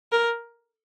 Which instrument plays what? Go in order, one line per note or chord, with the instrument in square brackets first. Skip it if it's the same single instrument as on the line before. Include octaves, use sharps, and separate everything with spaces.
[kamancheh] A#4